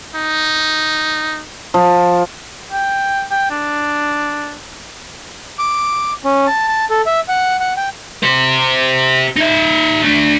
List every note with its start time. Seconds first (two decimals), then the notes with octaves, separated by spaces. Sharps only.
0.15 D#4
1.74 F3
2.72 G5
3.31 G5
3.51 D4
5.59 D6
6.25 C#4
6.47 A5
6.68 A5
6.90 A4
7.06 E5
7.28 F#5
7.60 F#5
7.77 G5
8.23 G4 C5
9.36 D#4 E5
10.03 A3 D4